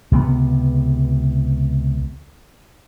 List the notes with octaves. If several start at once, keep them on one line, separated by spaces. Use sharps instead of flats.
C#2 C3 D#3 B3